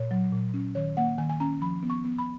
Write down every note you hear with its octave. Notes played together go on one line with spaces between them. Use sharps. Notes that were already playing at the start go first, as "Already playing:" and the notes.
Already playing: A#2 C#5
F#3
A#2
C#4
D#3 C#5
A#3 F#5
D#3 G#5
G#5
C#4 A#5
F3 B5
B3
C#6
B3
B5